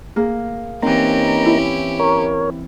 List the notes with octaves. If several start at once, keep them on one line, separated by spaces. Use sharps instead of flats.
A#3 G#4
E3 A#3 C4 C#4 D#4 G4 A#5
E4
A#4 C#5